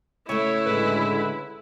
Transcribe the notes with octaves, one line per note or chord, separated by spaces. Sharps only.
C#3 A3 E4 C#5
A2 D3 G#3 B4